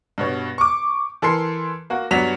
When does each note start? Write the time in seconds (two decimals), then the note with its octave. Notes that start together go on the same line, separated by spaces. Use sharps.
0.18 G2 B2 C#5
0.58 C#6 D6
1.22 E3 A4 A#4 C6 C7
1.90 A#3 F#4
2.11 G2 F#3 G3 B3 B6 F7